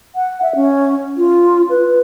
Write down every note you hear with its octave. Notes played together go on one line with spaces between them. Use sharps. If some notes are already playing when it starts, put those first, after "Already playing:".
F#5
E5
C#4
F4
B4